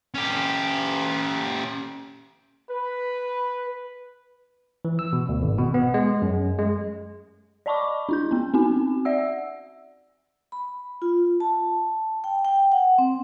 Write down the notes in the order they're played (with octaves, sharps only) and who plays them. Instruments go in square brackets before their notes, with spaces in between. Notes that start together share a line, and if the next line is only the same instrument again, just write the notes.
[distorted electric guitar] C#4 G4
[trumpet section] B4
[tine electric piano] E3
E6
B2
D2
G#1
B2
B3
G#3
F#2
G#3
[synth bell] D5 D#5 A5 B5 C#6 D6
D4 E4 G6
B3 C#4
C4 C#4 D#4 F#4 G#5
D5 E5 F#5 E6
[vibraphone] B5
F4
A5
G5
G5
F#5
C4